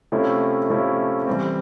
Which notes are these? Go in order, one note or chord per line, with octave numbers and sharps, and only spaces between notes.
C3 F3 A3 C#4 E4
C3 F3 A3 C#4 E4
C3 E3 G3 C4